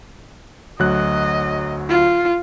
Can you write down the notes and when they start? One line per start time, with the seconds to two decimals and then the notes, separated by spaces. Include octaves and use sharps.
0.79 D2 F#3 D#5 F#6
1.89 F4